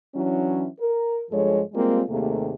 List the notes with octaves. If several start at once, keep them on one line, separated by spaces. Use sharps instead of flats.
E3 F#3 C#4 D4 E4
A#4
G2 F3 G#3 A4 C#5
G3 G#3 A#3 C4 F4
D#2 C3 A3 A#3 G#4